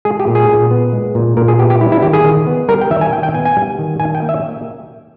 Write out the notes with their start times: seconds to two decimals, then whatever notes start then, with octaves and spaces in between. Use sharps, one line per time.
0.05 G#3 G#4
0.20 G4
0.27 A#2
0.35 G#4
0.49 A#2
0.71 B3
0.93 G#3
1.15 A#2
1.37 A#2 A#4
1.48 G#4
1.59 B3 G4
1.70 G4
1.81 G3 E4
1.92 E4
2.02 D#3 G4
2.13 G#4
2.25 D#3
2.47 B3
2.68 G3 A#4
2.81 G5
2.90 D#3 E5
3.01 G#5
3.13 D#3 G5
3.23 G5
3.34 B3 G#5
3.45 G#5
3.56 G3
3.79 D#3
4.00 D#3 G#5
4.15 G5
4.22 A#3
4.29 E5